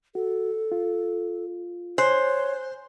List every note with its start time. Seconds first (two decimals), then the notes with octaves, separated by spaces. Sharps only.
0.15 F#4 A4
0.72 F4
1.98 C5 C#5 G#5 F#6